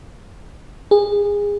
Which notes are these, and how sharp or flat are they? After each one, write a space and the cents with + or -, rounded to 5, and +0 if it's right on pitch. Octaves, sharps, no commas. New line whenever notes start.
G#4 -25